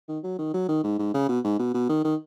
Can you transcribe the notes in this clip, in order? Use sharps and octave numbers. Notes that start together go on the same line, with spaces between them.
D#3
F#3
D#3
F#3
D#3
G#2
G#2
C#3
B2
G#2
B2
B2
D#3
D#3